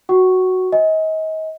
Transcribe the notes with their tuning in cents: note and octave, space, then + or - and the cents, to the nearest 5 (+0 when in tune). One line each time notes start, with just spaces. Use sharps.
F#4 +0 F#5 +35 C#6 +0
D#5 +30 G#5 -10